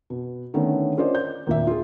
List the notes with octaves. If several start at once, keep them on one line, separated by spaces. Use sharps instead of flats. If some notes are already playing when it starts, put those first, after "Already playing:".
B2
D3 D#3 A3 B3 C#4
C#4 F4 A#4 C5 D5 D#5
G6
D#2 A#2 E5
F4 G#4